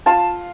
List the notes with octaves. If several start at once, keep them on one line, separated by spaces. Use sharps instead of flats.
F4 A5